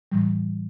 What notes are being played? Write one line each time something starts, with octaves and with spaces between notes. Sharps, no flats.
A2 E3 G3